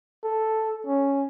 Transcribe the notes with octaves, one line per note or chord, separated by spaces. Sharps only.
A4
C#4